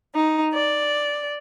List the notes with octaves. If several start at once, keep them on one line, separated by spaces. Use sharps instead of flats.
D#4
D5